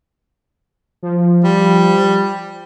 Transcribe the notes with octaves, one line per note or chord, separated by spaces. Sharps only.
F3
G3